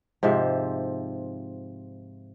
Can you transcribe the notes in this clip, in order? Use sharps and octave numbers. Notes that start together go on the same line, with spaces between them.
G#2 C3 F3 E5